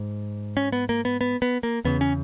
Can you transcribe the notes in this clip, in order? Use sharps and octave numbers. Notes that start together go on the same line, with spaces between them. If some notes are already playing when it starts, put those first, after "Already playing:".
Already playing: G#2
C#4
B3
A#3
B3
B3
B3
A#3
E2 C#3 B3
C#4